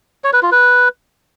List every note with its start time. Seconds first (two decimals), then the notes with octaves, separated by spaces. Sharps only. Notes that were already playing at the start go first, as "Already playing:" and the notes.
0.24 C#5
0.33 B4
0.43 F4
0.52 B4